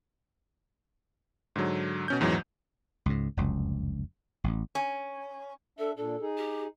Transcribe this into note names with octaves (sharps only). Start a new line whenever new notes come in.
G#2 D3 F#3
B2 C#4 G6
A#1 E2 G#2 E3 F#3
C#2 G#2
F1 C#2 F#2
A1
C#4
D4 A4 E5
A#2 D4 A4
D#4 G#4
G4